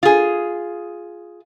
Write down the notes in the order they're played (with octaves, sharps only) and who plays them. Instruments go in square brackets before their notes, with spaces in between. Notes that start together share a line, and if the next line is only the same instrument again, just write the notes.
[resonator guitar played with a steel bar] F4 G#4